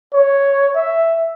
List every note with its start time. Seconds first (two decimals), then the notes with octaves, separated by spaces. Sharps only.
0.14 C#5
0.76 E5